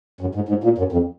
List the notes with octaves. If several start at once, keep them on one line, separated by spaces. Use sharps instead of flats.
F#2
G#2
G#2
A#2
F#2
F2